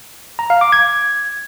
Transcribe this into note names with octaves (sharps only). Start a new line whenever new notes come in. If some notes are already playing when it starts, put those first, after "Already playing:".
A#5
F5
D6
G#6